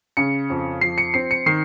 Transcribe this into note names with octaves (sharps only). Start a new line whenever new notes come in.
C#3 C#7
F2
F3 C7
C#7
C4 C7
C#7
D#3 C7